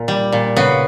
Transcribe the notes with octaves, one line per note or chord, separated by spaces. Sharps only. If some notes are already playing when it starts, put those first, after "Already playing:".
Already playing: A#2
G3
A#2
C#3 B3